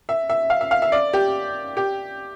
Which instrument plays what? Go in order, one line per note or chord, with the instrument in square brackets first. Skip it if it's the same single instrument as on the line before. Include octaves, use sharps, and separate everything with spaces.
[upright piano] E5
E5
F5
E5
F5
E5
D5
G4
G4